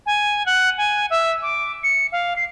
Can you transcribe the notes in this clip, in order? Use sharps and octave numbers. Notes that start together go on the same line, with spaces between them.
G#5
F#5
G#5
E5
D6
C#7
F5
C7